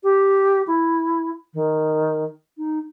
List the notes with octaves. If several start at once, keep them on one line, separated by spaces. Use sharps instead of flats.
G4
E4
D#3
D#4